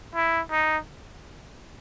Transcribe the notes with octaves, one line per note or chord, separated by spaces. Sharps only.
E4
D#4